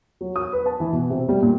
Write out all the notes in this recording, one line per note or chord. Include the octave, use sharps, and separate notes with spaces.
F#3
D#6
B4
A5
E3
B2
C3
G3
A#2